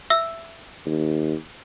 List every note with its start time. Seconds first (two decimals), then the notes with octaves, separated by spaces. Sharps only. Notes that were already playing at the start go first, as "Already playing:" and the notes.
0.10 E5 E6
0.86 D#2